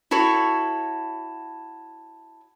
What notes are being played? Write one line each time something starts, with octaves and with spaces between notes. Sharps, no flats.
E4 F#4 A4 C#5